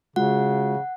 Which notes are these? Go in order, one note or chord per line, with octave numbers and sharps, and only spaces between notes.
C#3 G#3 F4 F#4 F#5